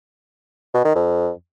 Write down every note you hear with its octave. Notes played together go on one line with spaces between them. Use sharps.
B2
D#3
F2